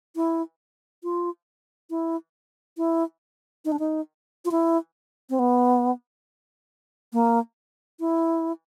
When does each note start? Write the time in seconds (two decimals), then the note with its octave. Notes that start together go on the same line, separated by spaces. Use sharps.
0.16 E4
1.03 F4
1.90 E4
2.77 E4
3.65 D#4
3.72 D4
3.79 D#4
4.45 F4
4.51 E4
5.30 C4
5.39 B3
7.13 A#3
8.00 E4